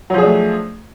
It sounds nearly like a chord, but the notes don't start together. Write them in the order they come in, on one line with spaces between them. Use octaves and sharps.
F#3 F3 G#4 D4 A3